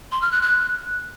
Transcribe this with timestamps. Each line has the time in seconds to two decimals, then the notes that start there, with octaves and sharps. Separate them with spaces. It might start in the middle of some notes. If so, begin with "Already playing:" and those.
0.12 C6
0.22 F6
0.32 F#6
0.42 F#6